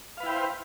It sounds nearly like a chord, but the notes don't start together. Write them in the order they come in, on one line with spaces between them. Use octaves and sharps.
F5 B4 E4 G5 C5